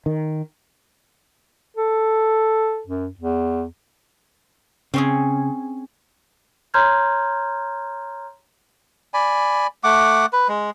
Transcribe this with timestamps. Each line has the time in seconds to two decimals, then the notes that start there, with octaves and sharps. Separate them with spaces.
0.06 D#3
1.76 A4
2.87 F#2
3.19 E2
4.94 C#3 C4 C#4 G#4
6.74 C#5 A#5 C6 F6 G6 G#6
9.14 D5 G#5 B5
9.84 A3 F#5 D6
10.33 B4
10.48 G#3